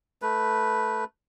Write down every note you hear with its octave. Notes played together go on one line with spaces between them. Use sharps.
A3 B4